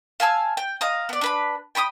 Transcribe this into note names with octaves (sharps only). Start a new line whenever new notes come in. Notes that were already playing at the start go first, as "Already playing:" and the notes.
F5 G#5 A5 E6
G5
D#5 F5 A#5 D#6
B3 D5
D4 B4 B5
G5 B5 C#6 D#6